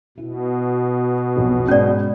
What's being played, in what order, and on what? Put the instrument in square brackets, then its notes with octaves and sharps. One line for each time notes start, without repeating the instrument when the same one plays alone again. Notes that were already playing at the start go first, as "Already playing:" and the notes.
[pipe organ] B2 [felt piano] E4
[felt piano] B1 F2
[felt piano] G#2 G#3 [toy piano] C#4 D5